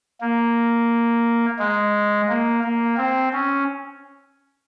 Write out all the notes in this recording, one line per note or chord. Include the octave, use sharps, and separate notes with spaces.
A#3
G#3
A#3
A#3
C4
C#4